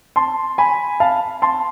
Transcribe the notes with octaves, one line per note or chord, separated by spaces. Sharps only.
A5 C6
G#5 B5
F5 A5
A5 C6